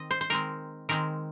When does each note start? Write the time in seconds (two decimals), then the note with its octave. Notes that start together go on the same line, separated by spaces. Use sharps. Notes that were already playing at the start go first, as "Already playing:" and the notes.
Already playing: D#3 C4 D#5
0.11 C5
0.21 C5
0.30 D#3 G#3 C4 A#4
0.89 D#3 G#3 C4 A#4